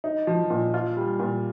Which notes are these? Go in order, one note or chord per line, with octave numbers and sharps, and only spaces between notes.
D#4
F3
A#2
F4
G3
A#2